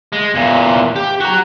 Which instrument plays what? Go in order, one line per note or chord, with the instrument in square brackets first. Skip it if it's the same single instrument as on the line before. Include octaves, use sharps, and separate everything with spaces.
[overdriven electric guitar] G#3
E2 A#2
G4
F#4 A#5